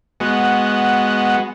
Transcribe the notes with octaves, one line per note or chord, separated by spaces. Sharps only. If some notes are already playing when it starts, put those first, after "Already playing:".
G#3 B3 F#4